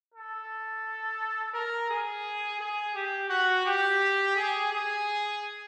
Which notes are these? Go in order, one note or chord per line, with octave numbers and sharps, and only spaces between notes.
A4
A#4
G#4
G#4
G4
F#4
G4
G#4
G#4